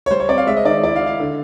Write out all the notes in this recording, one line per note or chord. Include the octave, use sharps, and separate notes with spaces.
C#5
G3 C5
C#5
C4 D5
F5
G#3 E5
D#5
D#3 D5
E4 D5
F5
E4
F5
D3